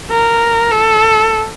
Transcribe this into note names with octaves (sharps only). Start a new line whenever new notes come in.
A#4
A4